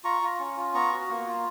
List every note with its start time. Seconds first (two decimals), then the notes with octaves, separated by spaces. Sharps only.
0.04 F4 A#5 C#6
0.22 F4
0.39 C#4
0.57 F4
0.74 B3 A#5 C#6
0.92 F#4
1.10 A#3
1.27 F4